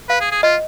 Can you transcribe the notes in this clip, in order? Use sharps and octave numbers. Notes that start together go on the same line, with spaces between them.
B4 F5
G#4
G#4
F4 D#5